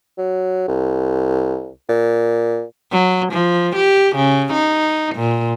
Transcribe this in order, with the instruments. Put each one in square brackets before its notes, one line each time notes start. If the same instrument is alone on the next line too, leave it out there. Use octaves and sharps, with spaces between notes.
[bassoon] F#3
C2
A#2
[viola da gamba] F#3
F3
G4
C#3
D#4
A#2